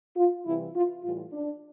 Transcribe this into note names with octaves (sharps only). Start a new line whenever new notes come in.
F4
C3 E3 G3 E4
F4
A2 E3 G3 F4
D4